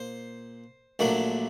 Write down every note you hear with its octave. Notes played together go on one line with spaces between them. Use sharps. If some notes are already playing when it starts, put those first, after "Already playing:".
Already playing: A#2 C5
A#1 A#2 F#3 A3 D4